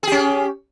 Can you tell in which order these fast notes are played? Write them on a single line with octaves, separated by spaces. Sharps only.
G#4 G4 C#4